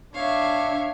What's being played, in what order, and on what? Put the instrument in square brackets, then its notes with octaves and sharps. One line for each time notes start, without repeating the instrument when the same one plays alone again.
[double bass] D4 [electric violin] C#5 E5 [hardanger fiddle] F5